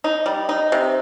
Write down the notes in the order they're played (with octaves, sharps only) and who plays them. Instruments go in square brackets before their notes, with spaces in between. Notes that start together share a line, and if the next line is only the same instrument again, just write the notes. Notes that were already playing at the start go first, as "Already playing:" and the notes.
[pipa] D#4
G3
D#4
C3